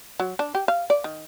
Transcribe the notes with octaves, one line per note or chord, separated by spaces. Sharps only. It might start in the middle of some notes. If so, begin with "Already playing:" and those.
F#3
D4
G4
F5
D5
D#3